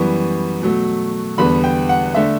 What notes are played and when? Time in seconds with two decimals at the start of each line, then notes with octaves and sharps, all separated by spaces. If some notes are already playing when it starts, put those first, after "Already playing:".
Already playing: F#2 E3 G3 B3 C#6
0.62 B2 F#3 A3
1.38 E2 D3 G3 B3 B5
1.64 G5
1.89 F#5
2.14 D3 A3 E5